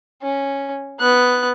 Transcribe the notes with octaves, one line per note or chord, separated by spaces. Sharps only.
C#4
B3 F#6